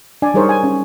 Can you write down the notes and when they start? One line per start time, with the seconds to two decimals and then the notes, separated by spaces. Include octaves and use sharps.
0.22 D4 D5 G#5
0.34 G3 D#4 G#4 A#4 C5 C#5
0.49 G#5
0.64 C#4